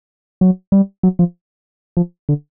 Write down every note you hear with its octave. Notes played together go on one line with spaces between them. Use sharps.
F#3
G3
F#3
F3
F3
D3